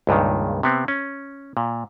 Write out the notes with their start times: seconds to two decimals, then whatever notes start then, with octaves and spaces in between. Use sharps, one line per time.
0.07 C#2 G2 A#2 D#3
0.63 C3 B3 C4
0.88 C#4
1.57 A#2